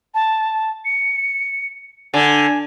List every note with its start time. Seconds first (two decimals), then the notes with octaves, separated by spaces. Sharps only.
0.14 A5
0.85 C#7
2.14 D3 G#5